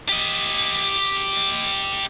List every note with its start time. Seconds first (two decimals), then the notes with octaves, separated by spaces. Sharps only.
0.09 G4 D#5